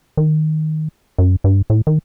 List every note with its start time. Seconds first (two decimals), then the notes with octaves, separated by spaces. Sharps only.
0.17 D#3
1.18 F#2
1.44 G2
1.70 A2
1.87 D#3